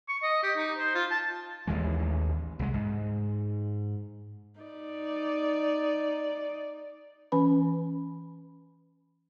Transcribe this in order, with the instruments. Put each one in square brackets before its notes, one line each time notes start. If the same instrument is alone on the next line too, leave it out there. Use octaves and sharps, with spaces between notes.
[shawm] C#6
D#5
G4
D#4
C5
F4
A5
[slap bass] A1 D#2 E3 G#3
C2 G#3
G#2
[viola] D#4 D5
[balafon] E3 C#4 B4 B5